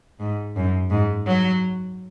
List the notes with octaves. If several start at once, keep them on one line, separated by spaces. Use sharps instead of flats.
G#2
F#2
G#2
F#3